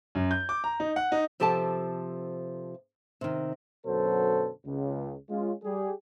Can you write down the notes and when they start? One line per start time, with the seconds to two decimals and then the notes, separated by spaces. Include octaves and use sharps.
0.15 F#2
0.31 G6
0.49 D6
0.64 A#5
0.80 D#4
0.96 F#5
1.12 D#4
1.40 C3 F3 G4 A4 G5 A5
3.21 C3 D#3
3.86 F#2 B2 D3 F#3 A4 C5
4.66 C#2
5.30 G#3 C#4 F4
5.64 G3 G4 G#4